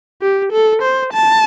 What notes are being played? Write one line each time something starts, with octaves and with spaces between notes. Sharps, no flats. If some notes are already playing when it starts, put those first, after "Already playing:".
G4
A4
C5
A5